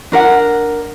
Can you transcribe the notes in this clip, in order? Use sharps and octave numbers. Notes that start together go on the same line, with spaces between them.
D4 A#4 F#5